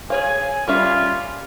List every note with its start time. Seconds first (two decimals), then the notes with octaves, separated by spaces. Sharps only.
0.10 G#4 C#5 F5 G#5
0.68 G3 C#4 F4 E5